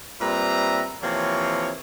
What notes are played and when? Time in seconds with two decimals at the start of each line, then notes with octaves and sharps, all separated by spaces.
0.20 A#2 G3 C4 B4 E5 A#5
1.02 C3 E3 F3 A#3 C#5